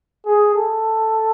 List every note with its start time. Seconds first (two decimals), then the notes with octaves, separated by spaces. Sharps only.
0.26 G#4
0.54 A4